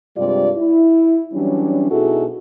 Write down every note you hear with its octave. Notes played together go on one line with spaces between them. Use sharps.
G2 C3 G3 G#3 F4 D5
E4
E3 F#3 G3 C#4 D4
B2 D#4 E4 F#4 G#4 A4